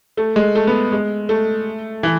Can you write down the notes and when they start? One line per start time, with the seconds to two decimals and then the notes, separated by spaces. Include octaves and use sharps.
0.17 A3
0.36 G#3
0.55 A3
0.67 B3
0.92 G#3
1.29 A3
2.03 E3